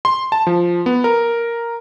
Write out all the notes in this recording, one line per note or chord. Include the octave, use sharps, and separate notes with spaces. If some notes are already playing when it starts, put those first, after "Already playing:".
C6
A5
F3
B3
A#4